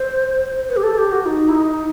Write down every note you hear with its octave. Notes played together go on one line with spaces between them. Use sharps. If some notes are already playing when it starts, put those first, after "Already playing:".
Already playing: C5
B4
G4
A4
G4
F#4
D#4
E4
D#4